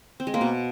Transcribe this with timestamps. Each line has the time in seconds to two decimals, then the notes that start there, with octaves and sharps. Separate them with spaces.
0.20 C4
0.27 G#3
0.34 A#3
0.41 B2